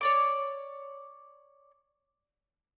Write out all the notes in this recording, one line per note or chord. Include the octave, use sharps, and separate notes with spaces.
C#5 D5 D6